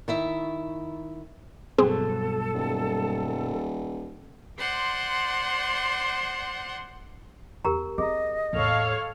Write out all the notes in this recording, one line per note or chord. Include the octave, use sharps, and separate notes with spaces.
D#3 E4 E5
G2 B2 F#3 C4 G#4 A4
D#1
C5 D5 F#5 C6
E2 G4 A#4 A#5
C4 G#4 D#5 A#5
E2 A2 A4 C#5 F5